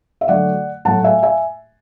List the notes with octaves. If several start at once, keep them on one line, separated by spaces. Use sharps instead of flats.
E5
D3 F#3 A3 D5 F#5
A2 F#3 A3 F#5 A5
E5 G#5
E5 G#5